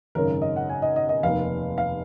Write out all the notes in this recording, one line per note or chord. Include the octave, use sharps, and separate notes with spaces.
G#1 F#2 C#3 A#4
D#5
F#5
G#5
D#5
D#5
D#5
F1 D#2 D#3 F5
F5